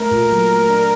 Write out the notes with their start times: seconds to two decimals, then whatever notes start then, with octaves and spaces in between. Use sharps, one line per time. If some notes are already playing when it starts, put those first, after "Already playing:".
Already playing: A3 A#4
0.11 A#2
0.31 F#3
0.50 A3
0.70 D4